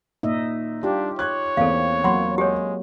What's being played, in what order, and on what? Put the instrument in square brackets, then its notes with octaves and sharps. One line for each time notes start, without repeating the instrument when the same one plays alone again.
[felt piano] A#2 [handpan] D#4 D#5 E5
[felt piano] G3 [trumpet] D4 [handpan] F4 G4
[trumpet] C#5 [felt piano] F#6 G#6
[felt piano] E2 [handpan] A#3 C4 [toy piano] A4 F5
[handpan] F#3 A#3 [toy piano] F#5 B5 C6
[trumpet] G#3 [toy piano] G4 G#4 C#5